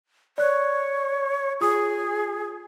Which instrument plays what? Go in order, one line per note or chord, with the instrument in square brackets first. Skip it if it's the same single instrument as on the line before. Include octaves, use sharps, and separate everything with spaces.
[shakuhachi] C#5 [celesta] D5 F#6
[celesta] F4 D#6 [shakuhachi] G#4